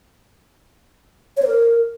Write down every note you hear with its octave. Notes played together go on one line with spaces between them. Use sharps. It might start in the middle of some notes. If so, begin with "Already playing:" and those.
C#5
C5
A#4